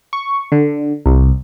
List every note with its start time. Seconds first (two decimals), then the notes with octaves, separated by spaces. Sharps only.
0.13 C#6
0.52 D3
1.06 C2